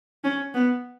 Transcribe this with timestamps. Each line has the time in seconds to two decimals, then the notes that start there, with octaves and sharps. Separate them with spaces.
0.24 C#4
0.54 B3